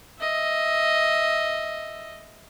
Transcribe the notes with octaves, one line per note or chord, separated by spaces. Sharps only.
D#5 E5